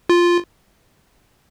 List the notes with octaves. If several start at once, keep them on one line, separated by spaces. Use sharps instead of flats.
F4